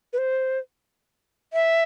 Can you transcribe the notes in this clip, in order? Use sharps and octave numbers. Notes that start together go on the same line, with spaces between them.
B4
C5
E5